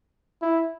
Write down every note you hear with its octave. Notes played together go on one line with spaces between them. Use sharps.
E4